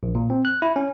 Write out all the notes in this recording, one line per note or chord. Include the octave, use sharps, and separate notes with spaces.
A#1
A#2
C4
F#6
E4
C#4